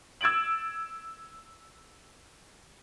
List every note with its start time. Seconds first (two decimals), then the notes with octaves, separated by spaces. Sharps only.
0.21 E6 G#6 A6 D7 F#7